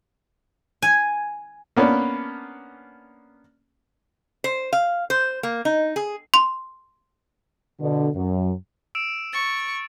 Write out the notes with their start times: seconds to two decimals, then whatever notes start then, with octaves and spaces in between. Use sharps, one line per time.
0.82 G#5
1.76 A#3 B3 C#4 D4
4.44 C5
4.73 F5
5.10 C5
5.43 A#3
5.65 D#4
5.96 G#4
6.34 C6
7.80 B2 D3
8.15 F#2
8.95 E6 D7 E7
9.33 C#6 A6